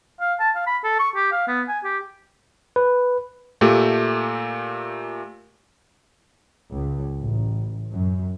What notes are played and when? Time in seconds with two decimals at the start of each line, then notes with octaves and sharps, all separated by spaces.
0.21 F5
0.40 A5
0.55 F5
0.67 B5
0.84 A4
0.99 C#6
1.16 G4
1.32 F5
1.48 B3
1.68 G#5
1.84 G4
2.76 B4
3.61 A#2 A3 G4
6.73 C#2
7.20 A1
7.92 F#2